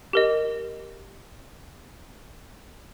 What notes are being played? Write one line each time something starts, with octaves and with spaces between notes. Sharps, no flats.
G4 A#4 D#5